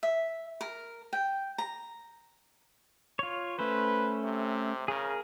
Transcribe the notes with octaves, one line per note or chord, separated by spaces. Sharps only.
E5
A#4
G5
A#5
F4 C#5
A3 C#4 B4 C5
C3
C#3 G#4 A#4